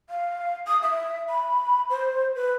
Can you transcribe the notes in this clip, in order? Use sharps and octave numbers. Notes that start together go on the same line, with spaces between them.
F5
D#6
E5
B5
C5
B4